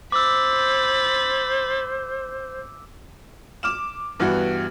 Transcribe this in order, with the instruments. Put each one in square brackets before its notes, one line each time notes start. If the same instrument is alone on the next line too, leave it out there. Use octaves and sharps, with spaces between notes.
[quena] C5 [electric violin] B5 A6 [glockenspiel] D6 E6
[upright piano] D6 F6 E7
G2 E3 B3 F#4